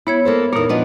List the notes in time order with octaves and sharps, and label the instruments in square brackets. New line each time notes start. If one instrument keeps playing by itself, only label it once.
[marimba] B3 C#5 G#6 [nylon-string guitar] E4
[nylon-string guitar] A#3 A4 C5
[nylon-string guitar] E2 A#4 [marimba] A#2 D#4
[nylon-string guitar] F3 B3 D4 [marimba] D5 D#5